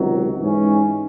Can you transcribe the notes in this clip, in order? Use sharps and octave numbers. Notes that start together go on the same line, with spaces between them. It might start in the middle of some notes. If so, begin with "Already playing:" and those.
Already playing: C#2 C3 D#3 F#3
G#2 E3 G#3 C#4